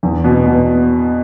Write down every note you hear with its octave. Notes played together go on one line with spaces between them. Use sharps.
E2
B2
B2